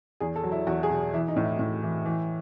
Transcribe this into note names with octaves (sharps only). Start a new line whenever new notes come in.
E2 G#4
A4
F#3
E4
E2 F#4
G#4
B2
E3 E4
D#4
A2
E4
A2
E3
E3